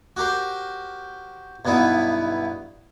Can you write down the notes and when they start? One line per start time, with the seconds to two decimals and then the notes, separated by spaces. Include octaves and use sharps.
0.17 F#4 G4 A#4 C5
1.65 B1 G2 B3 D#4 E4